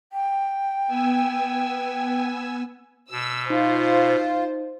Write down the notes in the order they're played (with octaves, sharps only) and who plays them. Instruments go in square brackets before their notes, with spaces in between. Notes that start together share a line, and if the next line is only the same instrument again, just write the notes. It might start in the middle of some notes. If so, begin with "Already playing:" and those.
[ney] G5
[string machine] B3 G#5 E6
[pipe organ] B2 [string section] E6
[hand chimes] D#4 [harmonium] F4 [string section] C5